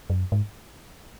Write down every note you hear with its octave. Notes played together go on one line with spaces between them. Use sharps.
F#2
G#2